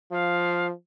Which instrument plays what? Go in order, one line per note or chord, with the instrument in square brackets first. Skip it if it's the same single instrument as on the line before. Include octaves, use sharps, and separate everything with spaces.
[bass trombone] F3 [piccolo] F5